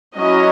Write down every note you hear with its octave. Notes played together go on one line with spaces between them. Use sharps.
F#3 C#4 E4 D#5